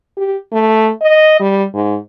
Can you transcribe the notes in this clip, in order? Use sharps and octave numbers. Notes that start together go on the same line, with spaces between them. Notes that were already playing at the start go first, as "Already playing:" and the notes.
G4
A3
D#5
G3
G#2